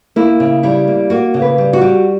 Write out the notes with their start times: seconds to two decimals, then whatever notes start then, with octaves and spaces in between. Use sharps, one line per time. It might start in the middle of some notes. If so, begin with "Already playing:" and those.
0.16 A#3 E4
0.40 C#3
0.63 G3 E4
0.88 A#3
1.10 A#3 F#4
1.34 C#3
1.42 B4
1.58 G3
1.73 F#4
1.81 G3